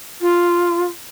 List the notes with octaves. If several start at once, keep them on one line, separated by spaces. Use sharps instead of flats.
F4